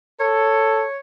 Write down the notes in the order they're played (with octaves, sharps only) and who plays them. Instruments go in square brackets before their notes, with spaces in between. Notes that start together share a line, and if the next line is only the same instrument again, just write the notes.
[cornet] A4 [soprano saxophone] C#5